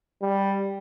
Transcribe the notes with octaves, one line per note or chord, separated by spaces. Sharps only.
G3